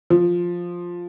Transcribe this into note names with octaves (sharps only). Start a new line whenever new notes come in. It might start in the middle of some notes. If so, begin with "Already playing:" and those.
F3